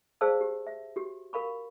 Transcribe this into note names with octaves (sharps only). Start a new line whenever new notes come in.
G#4 C5 D5 F5 A5 E6
G4
E5
F#4 G4
A#4 F5 B5 C#6